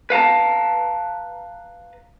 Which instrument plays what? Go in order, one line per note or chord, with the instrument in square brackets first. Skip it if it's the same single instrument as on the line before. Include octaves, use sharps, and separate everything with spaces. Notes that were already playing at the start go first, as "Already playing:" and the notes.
[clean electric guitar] B4 F5 A5 A#5